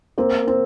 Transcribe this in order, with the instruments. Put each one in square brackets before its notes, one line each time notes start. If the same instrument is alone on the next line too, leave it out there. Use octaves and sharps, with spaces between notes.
[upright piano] A#3 [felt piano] C4
[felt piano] C4